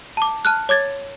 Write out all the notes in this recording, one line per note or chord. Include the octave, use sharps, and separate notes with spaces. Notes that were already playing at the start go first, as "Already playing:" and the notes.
A5 D6
A5 F6 F#6
C#5 D6 G#6 A6